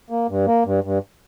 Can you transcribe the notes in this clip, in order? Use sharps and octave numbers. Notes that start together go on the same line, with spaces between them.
A#3
G2
A#3
G2
G2